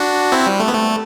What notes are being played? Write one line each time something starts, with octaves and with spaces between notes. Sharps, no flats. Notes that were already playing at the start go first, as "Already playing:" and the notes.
Already playing: D4 F#4
C4 E4
G3
A3
B3
A3